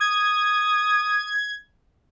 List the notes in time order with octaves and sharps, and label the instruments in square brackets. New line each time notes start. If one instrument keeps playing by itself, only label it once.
[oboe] D#6 [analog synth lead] G#6